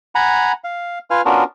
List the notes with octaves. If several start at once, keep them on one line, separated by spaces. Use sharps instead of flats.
F#5 G#5 A#5 B5
F5
F4 B4 F5 G#5 F6
B3 C#4 D4 F4 F#4 A#4